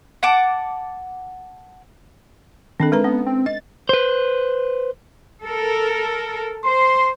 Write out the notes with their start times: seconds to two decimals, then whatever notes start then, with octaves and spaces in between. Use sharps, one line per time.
0.23 F#5 A5 D6
2.80 D#3 C4 D4 A4
2.92 G#3 B4 A#5
3.04 B3 C#4
3.26 C4
3.46 D#5 A6
3.89 B4 C5
5.43 A4 A#4
6.65 C5 C6